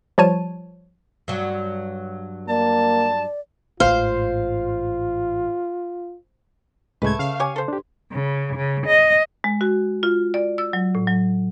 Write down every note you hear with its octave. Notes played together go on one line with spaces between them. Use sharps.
F3 G3 C#5 A5 D#7
G2 F#3
A#3 D5 A5
A1 G#2 F4 C5 F5
C#2 A2 G#3 A3 B4 G#6
C#3 F5
G4 C#5 G#5
A4 C5
D4 G4
C#3
C#3
D#5
G#3
F#4
F4
D5
E6
F#3
A2
F#3